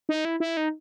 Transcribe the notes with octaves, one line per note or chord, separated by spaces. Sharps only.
D#4
E4
E4
D#4